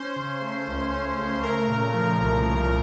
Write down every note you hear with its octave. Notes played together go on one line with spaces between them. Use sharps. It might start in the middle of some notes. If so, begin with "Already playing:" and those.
Already playing: C#4 C5 C6
C#3
A3
C#2
C#4
C#3
A3 A#4 A#5
A#2
F3
C2
A3